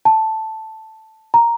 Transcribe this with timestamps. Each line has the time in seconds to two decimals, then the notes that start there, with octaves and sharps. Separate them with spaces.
0.05 A5
1.34 A#5